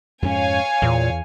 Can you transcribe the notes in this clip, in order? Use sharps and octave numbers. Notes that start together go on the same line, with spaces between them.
F2 G#2 C#4 C#5 F5 G#5
E2 A#2